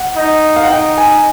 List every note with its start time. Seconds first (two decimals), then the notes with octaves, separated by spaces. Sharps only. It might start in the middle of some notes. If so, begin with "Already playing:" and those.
Already playing: F#5
0.16 D#4
0.56 F5
0.63 F#5
0.70 D#4 G5
0.98 G#5